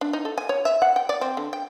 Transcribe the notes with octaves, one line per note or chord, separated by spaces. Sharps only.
D4
D#4
A4
G#5
C#5
E5
F#5
G5
D5
C4
D3
G5